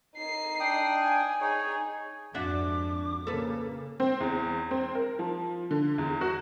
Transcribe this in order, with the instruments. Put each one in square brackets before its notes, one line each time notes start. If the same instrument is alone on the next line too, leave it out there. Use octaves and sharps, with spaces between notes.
[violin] D#4 C7
[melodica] D4 G5 D#6
[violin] G#5
[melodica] D#4 C#5 [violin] G#4
[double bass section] F2 G#2 [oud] D4 F#4 E5 [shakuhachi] D6
[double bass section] C#3 A#3 [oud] A4 B4
[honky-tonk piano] C4
E2
C4
A#4
F3
D3
E2
F#4